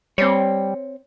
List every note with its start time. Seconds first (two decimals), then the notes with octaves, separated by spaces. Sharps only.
0.18 G3 C4 C#5